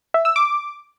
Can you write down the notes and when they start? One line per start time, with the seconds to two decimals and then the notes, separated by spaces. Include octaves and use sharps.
0.14 E5
0.25 E6
0.36 D6